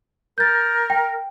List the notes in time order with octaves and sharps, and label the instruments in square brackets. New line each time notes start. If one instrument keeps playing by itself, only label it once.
[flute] A#4 [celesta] G6 A6
[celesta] G5